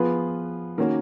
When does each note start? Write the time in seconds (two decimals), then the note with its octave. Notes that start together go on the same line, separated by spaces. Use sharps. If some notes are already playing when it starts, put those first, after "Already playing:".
Already playing: F3 B3 F4 G#4 B4
0.78 D#3 A#3 C#4 F#4 A#4